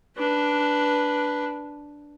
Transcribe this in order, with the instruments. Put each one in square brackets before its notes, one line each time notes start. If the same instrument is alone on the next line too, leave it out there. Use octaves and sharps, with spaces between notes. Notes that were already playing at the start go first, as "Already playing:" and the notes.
[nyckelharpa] D4 B4